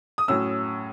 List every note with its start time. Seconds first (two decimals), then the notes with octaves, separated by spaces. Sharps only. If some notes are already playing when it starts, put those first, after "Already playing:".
0.18 D#6
0.28 A2 F#3 C#4 E6